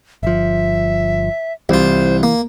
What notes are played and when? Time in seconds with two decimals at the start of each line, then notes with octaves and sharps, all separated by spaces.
0.23 G1 F3 E5
1.69 C2 E3 F4 C5
2.23 A#3